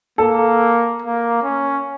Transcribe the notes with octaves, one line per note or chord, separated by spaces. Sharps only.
A#3 A4
A#3
C#4